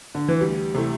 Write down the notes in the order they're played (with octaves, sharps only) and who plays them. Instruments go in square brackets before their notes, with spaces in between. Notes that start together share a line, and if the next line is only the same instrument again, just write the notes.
[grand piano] D3
E3
[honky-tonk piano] D2 [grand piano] G3
[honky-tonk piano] C3 A3 E4